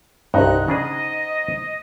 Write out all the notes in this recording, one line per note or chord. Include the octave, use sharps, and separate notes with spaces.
C2 G2 D#4 C5 F#5 A#5 F#6
C#3 D4 G#4 D#5